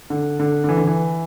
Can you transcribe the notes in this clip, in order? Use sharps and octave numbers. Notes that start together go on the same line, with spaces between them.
D3
D3
D3
E3
D3
E3